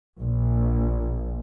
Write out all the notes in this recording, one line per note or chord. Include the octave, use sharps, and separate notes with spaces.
A#1